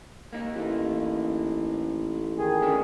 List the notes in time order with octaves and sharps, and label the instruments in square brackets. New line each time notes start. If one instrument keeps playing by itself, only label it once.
[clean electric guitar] A#3 D#4
[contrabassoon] A1
[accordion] D#3 G#4
[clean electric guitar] D2 C#4 D4